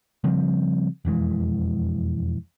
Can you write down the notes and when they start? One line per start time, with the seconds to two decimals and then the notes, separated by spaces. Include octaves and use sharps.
0.24 C#3 F3 G3 C4
1.05 E1 F2 E3 G#3